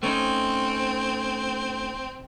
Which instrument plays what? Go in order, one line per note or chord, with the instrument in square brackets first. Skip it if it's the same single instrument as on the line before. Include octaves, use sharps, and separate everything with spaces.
[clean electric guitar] A3 C#4 D#4 [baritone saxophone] C4